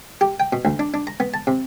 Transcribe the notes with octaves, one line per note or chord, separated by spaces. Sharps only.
G4
G5
B2
D2
D4
D4
A#5
B3
A5
C3